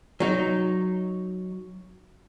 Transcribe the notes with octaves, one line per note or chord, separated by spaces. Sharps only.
F#3 D#4